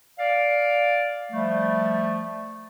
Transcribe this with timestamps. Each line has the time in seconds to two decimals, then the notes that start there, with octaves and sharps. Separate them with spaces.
0.19 D5 F5
1.32 F3 G3 A3